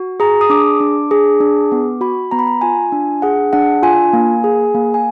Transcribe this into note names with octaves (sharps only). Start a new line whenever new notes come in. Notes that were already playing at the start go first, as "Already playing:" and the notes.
Already playing: F#4
G#4 A#5
D#6
D4 D6
D4
G#4
D4
B3
F#4 B5
B3 A#5
B5
A#5
F4 G#5
D4
G#4 F#5
D4 F#5
F4 G#5
A#3
G#4
A#3
G#5